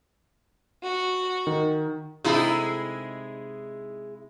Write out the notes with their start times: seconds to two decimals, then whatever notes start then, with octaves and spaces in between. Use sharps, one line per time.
0.83 F#4
1.47 D#3
2.24 C3 G#3 D#4 E4 G#4 A4